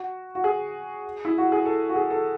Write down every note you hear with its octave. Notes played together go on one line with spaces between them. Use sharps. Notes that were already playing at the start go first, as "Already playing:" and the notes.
Already playing: F#4
F#4
G#4
E4
F#4
G#4
A4
F#4
G#4
A4